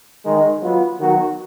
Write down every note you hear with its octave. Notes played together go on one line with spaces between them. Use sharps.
D#3 G#3 D#4
F#3 B3 F4
D#3 F#3 B3 F#4